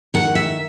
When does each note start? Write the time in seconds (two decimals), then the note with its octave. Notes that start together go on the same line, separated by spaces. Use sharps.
0.14 D#3 F#5
0.35 E5